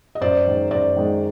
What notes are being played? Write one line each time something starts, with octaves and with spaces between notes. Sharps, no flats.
D#5
F#2 C5 D5
D#3 G#3
F#2 C5 D5
D#3 G#3